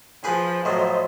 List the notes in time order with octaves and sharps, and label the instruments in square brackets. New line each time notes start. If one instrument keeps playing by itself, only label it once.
[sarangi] F3 [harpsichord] G#4 B4
[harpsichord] A2 F3 [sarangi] F#3 [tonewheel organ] C5 D#5